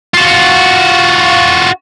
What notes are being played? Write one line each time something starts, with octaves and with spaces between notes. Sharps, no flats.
F4 F#4